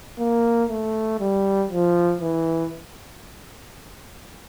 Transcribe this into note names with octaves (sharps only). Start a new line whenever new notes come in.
A#3
A3
G3
F3
E3